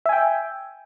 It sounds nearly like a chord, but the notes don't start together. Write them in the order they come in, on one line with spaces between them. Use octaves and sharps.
E5 G#5 G5